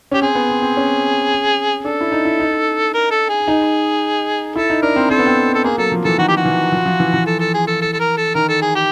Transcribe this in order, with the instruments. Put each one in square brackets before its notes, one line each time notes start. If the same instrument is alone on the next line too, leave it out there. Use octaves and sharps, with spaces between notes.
[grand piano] C#4 [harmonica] G4
[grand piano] C4 [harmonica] G#4
[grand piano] B3
C4
C4
C#4
[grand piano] D4 [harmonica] A4
[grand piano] E4
D#4
E4
D#4
[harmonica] A#4
A4
G#4
[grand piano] D#4
[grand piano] E4 [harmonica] A4
[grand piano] D#4
[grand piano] D4 [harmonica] A#4
[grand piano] C4
[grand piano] C4 [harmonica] A4
[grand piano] B3
C4
[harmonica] A4
[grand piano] A#3 [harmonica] G#4
[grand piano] F#3 [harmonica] A4
[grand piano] F3
[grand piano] E3 [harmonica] A4
[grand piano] D#3 [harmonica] F#4
[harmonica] G4
F#4
[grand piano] E3
F3
F3
E3
E3
[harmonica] A4
A4
G#4
A4
A4
A4
A#4
A4
[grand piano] D#3 [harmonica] A#4
[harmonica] A4
G#4
G4